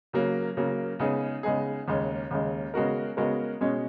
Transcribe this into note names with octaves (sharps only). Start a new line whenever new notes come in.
C#3 F#3 A#3
C#3 F#3 A#3
C#3 G#3 B3 D#4 G#4
C#3 G#3 B3 D#4 G#4
D#2 C#3 G#3
D#2 C#3 G#3
C#3 G#3 B3 F#4 A#4
C#3 G#3 B3 F#4 A#4
B2 G#3 C#4